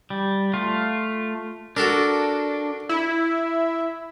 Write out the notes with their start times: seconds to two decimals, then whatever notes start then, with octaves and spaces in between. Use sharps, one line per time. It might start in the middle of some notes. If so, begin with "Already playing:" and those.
0.10 G3
0.53 A3 F4
1.77 D4 F#4 A4 A#4
2.89 E4